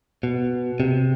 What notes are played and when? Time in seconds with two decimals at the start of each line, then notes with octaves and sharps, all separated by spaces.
0.23 B2
0.80 C3